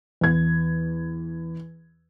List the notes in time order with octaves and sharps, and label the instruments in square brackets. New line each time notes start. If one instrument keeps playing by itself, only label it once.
[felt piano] E2 G#6